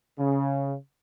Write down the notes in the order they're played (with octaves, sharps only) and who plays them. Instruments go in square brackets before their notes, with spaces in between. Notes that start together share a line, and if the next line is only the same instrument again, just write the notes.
[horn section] C#3